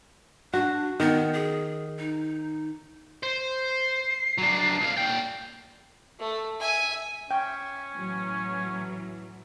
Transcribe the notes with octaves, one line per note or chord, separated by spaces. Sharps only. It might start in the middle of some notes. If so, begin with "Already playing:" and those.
D4 F#4
D#3 B3
G#4
D#4
C5
C7
F#3 D4
C2 F5
A#2 G5
A3
E5 G#5
C#4 E5 G5
A2 E3 F#3